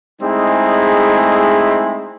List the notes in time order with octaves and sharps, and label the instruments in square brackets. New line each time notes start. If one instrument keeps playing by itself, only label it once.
[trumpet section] G#3 A3 C4 D#4 E4 G#4